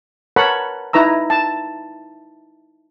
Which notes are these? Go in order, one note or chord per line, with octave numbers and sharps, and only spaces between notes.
A#4 B4 C#5 F#5 A5 B5
D#4 E4 B4 A#5 E6
A5